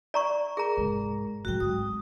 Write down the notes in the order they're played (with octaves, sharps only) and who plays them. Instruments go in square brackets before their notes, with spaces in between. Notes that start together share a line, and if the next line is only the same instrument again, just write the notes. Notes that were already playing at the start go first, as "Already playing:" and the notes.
[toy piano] D5 A#5 C#6
[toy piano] G#4 A#5 [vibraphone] A#4
[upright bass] F1 G#2
[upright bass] A2 F#3 [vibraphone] F#4 G5
[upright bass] G#1 [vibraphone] D#6